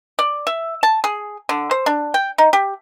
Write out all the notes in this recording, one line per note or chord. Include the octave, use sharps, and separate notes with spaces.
D5
E5
A5
G#4
D3
C5
D4
G5
D#4
G4